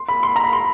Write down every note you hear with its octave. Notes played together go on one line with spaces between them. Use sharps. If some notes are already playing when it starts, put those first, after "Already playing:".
Already playing: C6
B5
C6
A#5
B5
C6